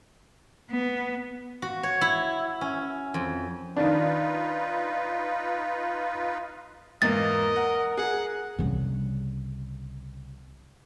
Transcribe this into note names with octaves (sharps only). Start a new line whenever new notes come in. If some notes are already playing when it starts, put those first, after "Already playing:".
B3
F#4
C#5
E4
C#4
F2
D#3 D4 D#4 F4 B4
E2 G#2 A#3 A#4 D#5 A6
F#5
G#4 F#5
C2 C#3